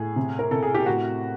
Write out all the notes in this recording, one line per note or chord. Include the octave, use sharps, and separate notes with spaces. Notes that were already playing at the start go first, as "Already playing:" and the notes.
Already playing: A2 G#4
C3
A#4
C3 A4
G#4
G4
A2 F#4